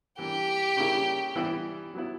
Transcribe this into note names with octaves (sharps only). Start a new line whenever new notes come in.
E3 A#3 D4 G4
C#3 G3 A#3 E4
E3 G3 B3 E4
F#3 B3 E4